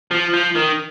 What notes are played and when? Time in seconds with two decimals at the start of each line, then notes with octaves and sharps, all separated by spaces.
0.11 F3
0.33 F3
0.55 D#3